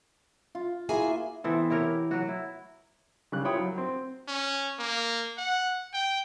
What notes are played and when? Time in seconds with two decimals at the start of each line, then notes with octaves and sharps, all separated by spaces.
0.55 F4
0.89 A#3 E4 F#4 G#4 G#5 C6
1.44 E3 B3 C4 A4
1.70 E4 G4 A#4 C#5
2.11 F#3 F#4
2.28 E4
3.32 C#3 G3 F#6
3.44 E4 F4 C#5 G5 B5 D#6
3.58 F#3
3.78 C4
4.28 C#4
4.79 A#3
5.38 F#5
5.93 G5